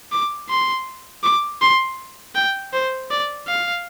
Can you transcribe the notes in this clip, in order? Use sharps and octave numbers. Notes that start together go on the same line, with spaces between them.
D6
C6
D6
C6
G5
C5
D5
F5